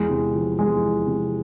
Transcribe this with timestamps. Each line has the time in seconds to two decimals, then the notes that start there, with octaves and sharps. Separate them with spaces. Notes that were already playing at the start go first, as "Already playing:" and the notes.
Already playing: E2 G#3
0.10 C3
0.34 F3
0.58 E2 G#3
0.82 E2
1.07 C3